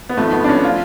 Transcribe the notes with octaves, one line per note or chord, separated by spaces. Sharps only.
B3
G#1 G#2 F3 A3
B3
D4
C#4
F3 F4